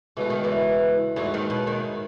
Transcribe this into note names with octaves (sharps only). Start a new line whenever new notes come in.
C#2 B2 E3 A3
D#3
E2 E3
E2 G#2 E3 F#3 A3
D#2 D#3
B2
D#2 D#3